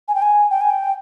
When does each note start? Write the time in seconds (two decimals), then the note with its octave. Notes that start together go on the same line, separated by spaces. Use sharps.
0.08 G#5
0.15 G5
0.22 G#5
0.50 G5
0.61 G#5
0.70 G5